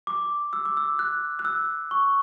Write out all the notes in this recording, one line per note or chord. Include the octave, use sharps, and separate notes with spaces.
D6
E6
D6
E6
F#6
F#6
E6
C#6